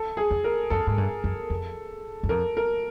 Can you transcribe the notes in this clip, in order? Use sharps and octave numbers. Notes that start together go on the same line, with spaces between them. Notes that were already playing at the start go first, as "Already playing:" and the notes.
Already playing: A4
G#4
F2
A#4
F#2 A4
G#2
G2
F#2
F2
F#2
F2 A#4
A#4